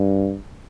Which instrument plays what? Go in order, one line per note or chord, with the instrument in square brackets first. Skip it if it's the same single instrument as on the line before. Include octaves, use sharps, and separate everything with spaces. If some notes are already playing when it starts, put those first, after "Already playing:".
Already playing: [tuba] G2